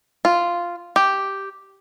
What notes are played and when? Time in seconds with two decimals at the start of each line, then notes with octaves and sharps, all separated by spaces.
0.25 F4
0.96 G4